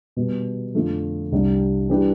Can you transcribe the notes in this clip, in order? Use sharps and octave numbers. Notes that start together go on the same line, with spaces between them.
B2 G3 B3
F2 D3 A3 C4 F4
C2 C3 G3 D4
E3 G3 D4 G4 B4